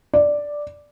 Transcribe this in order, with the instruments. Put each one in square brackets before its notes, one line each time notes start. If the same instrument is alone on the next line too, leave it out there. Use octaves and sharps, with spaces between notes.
[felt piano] D5